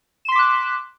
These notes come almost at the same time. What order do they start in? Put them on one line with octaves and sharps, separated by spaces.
E7 C6 B6 D6 F#6